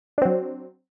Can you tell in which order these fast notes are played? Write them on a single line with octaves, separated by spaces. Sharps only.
D4 C4 F#3